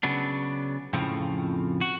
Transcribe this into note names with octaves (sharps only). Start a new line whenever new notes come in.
C#3 F#3 B3 D4
F2 A2 C#3 F3 C4
F#4